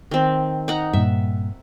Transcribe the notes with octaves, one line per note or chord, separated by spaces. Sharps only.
D#3 C4
D#4 F#5 A#5
G2 A#2 E5